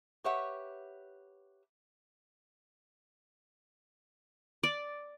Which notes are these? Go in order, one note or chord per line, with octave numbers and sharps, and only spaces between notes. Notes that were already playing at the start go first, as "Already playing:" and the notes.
G4 B4 C#5 E5 F#5
D5